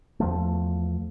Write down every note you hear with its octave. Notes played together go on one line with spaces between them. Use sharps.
E2 F3 A3